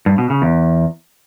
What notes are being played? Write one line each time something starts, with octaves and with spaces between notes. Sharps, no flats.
G2
B2
C#3
E2